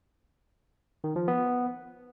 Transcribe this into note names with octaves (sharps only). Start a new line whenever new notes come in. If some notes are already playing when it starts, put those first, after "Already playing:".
D#3
F3
B3